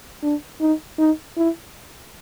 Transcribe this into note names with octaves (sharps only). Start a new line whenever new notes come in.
D4
D#4
D#4
E4